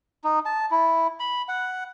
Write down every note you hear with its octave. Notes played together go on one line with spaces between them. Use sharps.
D#4
A5
E4
B5
F#5